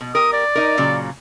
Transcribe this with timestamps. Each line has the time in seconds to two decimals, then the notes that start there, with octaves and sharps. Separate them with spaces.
0.01 B2
0.15 G4 A#4 D#6
0.33 D5
0.55 D#4 A#4
0.77 A#2 C#3 F#3